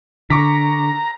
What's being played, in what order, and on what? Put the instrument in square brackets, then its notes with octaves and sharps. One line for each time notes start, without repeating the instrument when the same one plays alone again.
[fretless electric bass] D3 [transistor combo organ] A#5 [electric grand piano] C#6 D6 B6